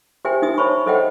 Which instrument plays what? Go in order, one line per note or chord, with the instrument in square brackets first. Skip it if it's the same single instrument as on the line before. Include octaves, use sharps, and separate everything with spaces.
[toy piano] G4 C5 E5 G5 G#5
D#4 E5 D#6
C5 C#5 A5 B5 C#6
A4 C5 D#5 E5 F#5 G5